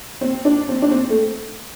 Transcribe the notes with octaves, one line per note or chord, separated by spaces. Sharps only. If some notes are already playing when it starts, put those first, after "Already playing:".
C4
D4
C4
D4
C4
A3